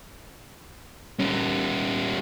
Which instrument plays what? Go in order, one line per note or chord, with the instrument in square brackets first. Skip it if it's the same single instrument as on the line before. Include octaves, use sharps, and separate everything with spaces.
[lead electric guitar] G3 C#4